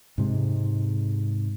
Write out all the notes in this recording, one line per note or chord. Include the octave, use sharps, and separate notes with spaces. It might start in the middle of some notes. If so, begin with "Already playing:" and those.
G#2 C3 G#3